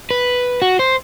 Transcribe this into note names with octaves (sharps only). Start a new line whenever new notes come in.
B4
F#4
C5